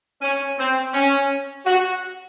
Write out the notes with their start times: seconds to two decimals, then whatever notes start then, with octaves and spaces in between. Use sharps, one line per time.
0.22 C#4
0.58 C4
0.93 C#4
1.66 F#4